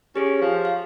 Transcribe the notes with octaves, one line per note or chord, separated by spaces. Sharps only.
C#4 G4 G#4 C#5
F3
F5